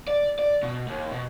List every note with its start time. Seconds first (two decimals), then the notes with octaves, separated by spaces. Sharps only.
0.08 D5
0.39 D5
0.63 B2
0.88 D#2
1.12 B2